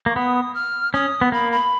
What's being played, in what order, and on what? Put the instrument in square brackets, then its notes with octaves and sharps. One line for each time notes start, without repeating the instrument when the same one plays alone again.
[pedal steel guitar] A#3 [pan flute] C#6
[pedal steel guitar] B3 [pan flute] D#6
[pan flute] F6
[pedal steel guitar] C#4 [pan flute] D#6
[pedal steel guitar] B3
[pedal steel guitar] A#3 [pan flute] B5
[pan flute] B5